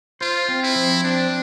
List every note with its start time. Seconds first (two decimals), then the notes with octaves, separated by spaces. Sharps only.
0.21 F4 C5
0.48 C4
0.63 E4
0.76 F3
1.04 C4 D4